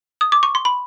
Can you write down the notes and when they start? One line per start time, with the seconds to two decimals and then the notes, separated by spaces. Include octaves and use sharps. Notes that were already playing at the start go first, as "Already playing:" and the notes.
0.21 D#6
0.32 D6
0.43 C#6
0.55 C6
0.65 B5